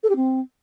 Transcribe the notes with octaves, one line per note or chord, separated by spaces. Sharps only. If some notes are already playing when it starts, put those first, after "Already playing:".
A4
G4
C4